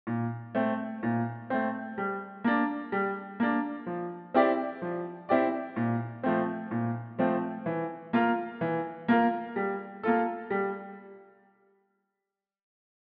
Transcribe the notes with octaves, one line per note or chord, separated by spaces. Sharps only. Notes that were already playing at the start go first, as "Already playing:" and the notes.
A#2
A3 C4
A#2
A3 C4
G3
A#3 D4
G3
A#3 D4
F3
C4 E4 G4 D5
F3
C4 E4 G4 D5
A#2
F3 A3 C4
A#2
F3 A3 C4
E3
A#3 F4 A#4
E3
A#3 F4 A#4
G3
A#3 F4 A4
G3